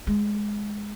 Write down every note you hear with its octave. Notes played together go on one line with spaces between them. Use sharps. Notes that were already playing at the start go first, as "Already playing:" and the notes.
G#3